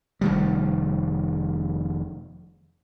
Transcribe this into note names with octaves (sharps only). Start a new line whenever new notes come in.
F1 D#3 G3